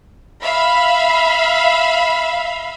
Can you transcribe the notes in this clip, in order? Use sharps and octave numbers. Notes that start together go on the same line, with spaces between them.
E5 F5 B5